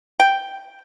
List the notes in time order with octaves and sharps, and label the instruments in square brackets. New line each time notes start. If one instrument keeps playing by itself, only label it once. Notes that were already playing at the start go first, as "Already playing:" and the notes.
[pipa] G5